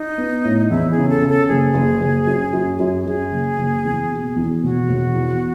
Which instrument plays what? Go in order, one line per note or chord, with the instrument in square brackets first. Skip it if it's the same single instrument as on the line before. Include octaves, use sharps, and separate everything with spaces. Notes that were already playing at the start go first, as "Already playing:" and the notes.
Already playing: [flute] D#4
[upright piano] B3
A2
[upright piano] E2 [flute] E4
[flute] G#4
[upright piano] C#3
[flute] A4
[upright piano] C#3
[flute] A4
[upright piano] F#1 [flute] G#4
[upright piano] F#1
F#1
F#2
F#2
F#2
[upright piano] F#2 [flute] G#4
[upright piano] F#1
F#1
E2
B2
E2
[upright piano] E1 [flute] F#4
[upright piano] E1
E2